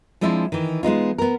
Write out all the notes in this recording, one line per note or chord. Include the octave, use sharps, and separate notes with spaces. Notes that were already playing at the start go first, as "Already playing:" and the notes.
F3 G#3 C4 D4 E4 F4
D#3 E3
G#3 B3 D#4 F4
B3 A#4